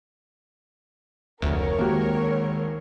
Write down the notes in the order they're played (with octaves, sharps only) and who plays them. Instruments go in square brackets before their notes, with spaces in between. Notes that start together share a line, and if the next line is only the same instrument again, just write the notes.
[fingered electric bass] F1 [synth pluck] D2 [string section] A#4 C#5
[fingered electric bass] D#3 G#3 [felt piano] A#3 F#4 G4